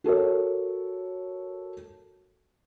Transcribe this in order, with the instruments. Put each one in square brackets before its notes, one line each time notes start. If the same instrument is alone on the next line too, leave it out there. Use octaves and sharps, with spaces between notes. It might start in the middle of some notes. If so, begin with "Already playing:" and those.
[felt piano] F#4 A4 A#4 C#5